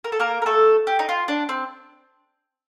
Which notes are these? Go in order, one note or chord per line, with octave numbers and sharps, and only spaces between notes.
A#4
A4
A#3 A#4
A#4
A3 A4
G4
D#4
F4
D4
C4